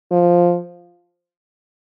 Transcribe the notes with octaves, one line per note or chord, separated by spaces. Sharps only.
F3